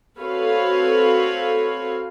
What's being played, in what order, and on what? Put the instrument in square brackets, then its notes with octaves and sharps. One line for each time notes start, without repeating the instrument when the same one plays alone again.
[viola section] C4 F#4 A4 B4 C#5 F5